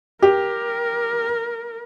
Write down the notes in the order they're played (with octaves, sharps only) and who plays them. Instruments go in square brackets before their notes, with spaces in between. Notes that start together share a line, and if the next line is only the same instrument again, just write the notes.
[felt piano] G4 [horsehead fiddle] A#4